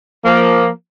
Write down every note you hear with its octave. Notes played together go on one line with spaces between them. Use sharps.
F3 A#3